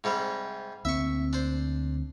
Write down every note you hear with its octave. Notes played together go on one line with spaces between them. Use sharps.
G#2 C3 G3
D2 A#3 C4 E5 C#6
D4 C5